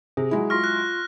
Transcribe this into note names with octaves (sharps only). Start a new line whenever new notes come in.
C3 G#4
F#3 G#3 E4
F4 C6 C#6 F6 A#6
F#6